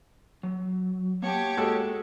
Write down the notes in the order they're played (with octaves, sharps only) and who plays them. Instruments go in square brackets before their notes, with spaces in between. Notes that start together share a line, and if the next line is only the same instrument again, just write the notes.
[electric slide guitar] F#3
[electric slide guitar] A#3 F#5 A5 [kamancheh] G4 C#5
[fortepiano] G#3 F#4 A4